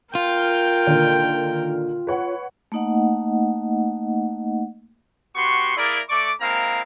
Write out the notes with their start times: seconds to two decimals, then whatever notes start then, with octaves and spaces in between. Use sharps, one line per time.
0.15 F4 A#4 G5
0.87 A#2 D3 D#3
2.07 B4 C#5 F#5
2.72 A3 A#3 D#4 D#5 F#5
5.36 B3 F#4 G4 C6 C#6
5.77 A#3 E4 G#4 A#4 D5
6.09 A3 D5 C#6 D6
6.41 G#3 A#3 C4 E4 F5 A#5